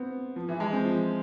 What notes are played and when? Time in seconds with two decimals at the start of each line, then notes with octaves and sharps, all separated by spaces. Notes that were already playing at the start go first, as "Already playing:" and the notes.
Already playing: B3 C4
0.36 F3
0.49 E3
0.60 G#3
0.73 C4
0.85 F3